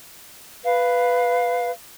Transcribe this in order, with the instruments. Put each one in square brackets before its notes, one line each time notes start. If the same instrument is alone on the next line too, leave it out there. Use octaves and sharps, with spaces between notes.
[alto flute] B4 [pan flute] F5